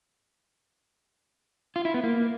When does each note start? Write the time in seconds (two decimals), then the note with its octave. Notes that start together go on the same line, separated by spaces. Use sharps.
1.76 F4
1.85 E4
1.94 B3
2.04 A#3